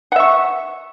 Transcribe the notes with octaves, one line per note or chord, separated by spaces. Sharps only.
E5 F#5 C#6